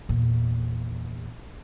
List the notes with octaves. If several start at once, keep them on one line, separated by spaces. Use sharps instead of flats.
E2 A#2